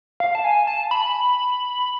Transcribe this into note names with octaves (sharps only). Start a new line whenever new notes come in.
F5
A5
G#5
A5
B5